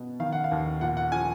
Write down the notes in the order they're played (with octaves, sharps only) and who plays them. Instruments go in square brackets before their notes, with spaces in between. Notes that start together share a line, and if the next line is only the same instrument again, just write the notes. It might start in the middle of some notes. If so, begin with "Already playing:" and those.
Already playing: [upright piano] B2
D#3 F5
F#5
F5
D#2
A#2 F#5
F#5
F3 G#5